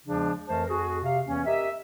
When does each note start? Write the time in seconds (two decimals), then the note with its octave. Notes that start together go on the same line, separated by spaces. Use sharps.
0.07 E2 C#3 F3 G#3 D4
0.49 F2 E3 A3 A#4 C5 A5
0.69 F2 F#4 G#4
1.03 C3 F5
1.26 E2 E3 A#3 C#4
1.46 G4 A#4 D#5 E5